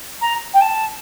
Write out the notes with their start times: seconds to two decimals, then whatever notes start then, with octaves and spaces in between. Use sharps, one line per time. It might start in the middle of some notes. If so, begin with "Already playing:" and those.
0.21 A#5
0.53 G5
0.61 A5